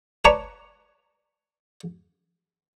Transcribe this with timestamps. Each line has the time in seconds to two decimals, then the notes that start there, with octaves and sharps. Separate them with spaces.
0.25 B4 C#5 D5 A5 A#5 C#6